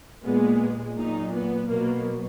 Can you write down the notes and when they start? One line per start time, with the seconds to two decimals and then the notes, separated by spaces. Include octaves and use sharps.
0.24 A#2 G#3 B3
0.97 A#2 F#3 D#4
1.33 B3
1.70 B2 F#3 A#3